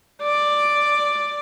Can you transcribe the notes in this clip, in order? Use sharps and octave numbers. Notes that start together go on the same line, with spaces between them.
D5